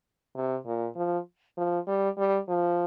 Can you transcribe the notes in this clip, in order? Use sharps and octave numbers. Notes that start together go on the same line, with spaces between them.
C3
A#2
F3
F3
G3
G3
F3